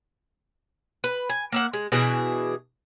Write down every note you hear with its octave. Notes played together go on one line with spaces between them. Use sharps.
B4
G#5
A#3 E5 F#5
G#3
B2 E3 D4 G#4